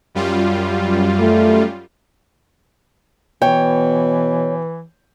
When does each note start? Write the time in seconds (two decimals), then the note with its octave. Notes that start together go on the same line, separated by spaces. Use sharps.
0.15 F#2 G3 F4
1.20 A3
3.42 B2 E3 C#5 G5